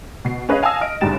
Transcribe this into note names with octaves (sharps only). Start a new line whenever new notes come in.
B2 C7
C#4 G#4 B4 C#5 D#5 F5
F5 G#5 A5 D#6 E6 A#6
D#5 F6 D7
G1 G#2 C#3 G3 A6 E7